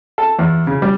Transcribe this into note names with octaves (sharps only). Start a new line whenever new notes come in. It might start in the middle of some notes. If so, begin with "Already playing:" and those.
A4
E2
C#3
G3